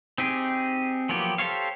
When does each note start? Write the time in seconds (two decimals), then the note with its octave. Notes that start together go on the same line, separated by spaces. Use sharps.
0.18 C4 D#4 G4 G#4
1.09 F3 F#3 A#3 B3 G4
1.38 G4 A4 C5 C#5 F5